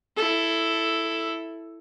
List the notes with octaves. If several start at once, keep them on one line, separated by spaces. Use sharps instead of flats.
E4 A4